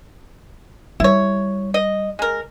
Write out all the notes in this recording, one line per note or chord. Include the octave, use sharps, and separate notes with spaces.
G3 E4 C#5
D#5
G#3 A#4